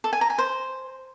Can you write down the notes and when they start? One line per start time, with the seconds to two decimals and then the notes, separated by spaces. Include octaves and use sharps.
0.04 A4
0.13 G#5
0.21 A#5
0.30 G#5
0.38 C5